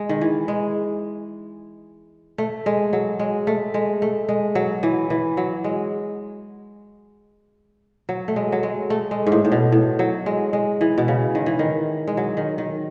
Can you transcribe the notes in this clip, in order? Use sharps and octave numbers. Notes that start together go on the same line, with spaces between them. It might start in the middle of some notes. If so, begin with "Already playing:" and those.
Already playing: G#3
D#3
E3
G#3
A3
G#3
F#3
G#3
A3
G#3
A3
G#3
F#3
E3
E3
F#3
G#3
F#3
A3
G#3
F#3
G#3
A3
G#3
G#2
A2
A2
B2
A2
F#3
G#3
G#3
E3
B2
C#3
D#3
E3
D#3
G#3
F#3
D#3
D#3